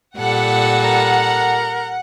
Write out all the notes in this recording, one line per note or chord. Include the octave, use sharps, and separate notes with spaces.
A#2 G3 A4 F#5
A#4